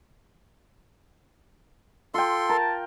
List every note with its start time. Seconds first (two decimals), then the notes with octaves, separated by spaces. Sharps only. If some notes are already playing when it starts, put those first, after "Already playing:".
2.14 F4 A4 G5 C6
2.49 A#4 A5